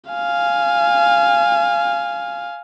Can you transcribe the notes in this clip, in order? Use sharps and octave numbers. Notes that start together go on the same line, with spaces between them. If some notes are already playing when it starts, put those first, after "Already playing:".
F5 G#5